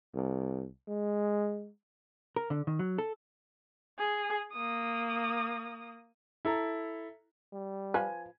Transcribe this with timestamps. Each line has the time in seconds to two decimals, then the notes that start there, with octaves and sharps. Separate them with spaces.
0.15 C2
0.88 G#3
2.36 A#4
2.50 D3
2.67 D#3
2.79 F#3
2.98 A4
3.99 G#4
4.53 A#3 D#6
6.45 E4 A4 A#5
7.53 G3
7.94 F3 F4 B4 G#5